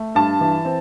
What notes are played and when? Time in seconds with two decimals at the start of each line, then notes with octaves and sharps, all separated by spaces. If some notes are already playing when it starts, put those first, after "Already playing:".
Already playing: A3
0.15 G2 A5
0.41 E3
0.65 C4